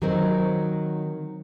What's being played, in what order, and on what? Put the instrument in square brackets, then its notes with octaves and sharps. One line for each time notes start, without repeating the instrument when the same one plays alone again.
[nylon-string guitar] D#3 F#3 C4 F#4 A#4